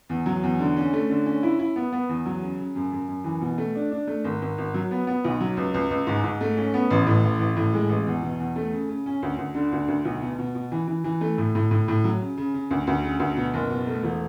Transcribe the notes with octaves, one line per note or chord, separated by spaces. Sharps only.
E2
F#3
E2
D3
C#4
A3
D3
C#4
E4
E4
B3
B3
E2
F#3
C#3
C#3
F#2
F#2
F#2
E3
B2
A3
D4
D4
A3
G#1
G#1
G#1
F#3
B3
B3
B1
F#3
C#2
C#2
C#2
G#2
G#2
A3
C#4
B3
A1
A2
A1
A1
A2
G#3
A1
E2
B2
E2
A3
C#3
C#3
C#4
D2
D2
D3
D2
D2
B1
B2
B2
B2
E3
E3
E3
A3
A2
A2
A2
A2
F#3
C#3
C#3
C#3
D2
D2
C#3
D2
B2
F#1
B2
A3
E1